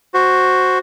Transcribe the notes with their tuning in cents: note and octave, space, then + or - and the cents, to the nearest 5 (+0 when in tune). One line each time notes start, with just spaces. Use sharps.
F#4 +0 C5 +0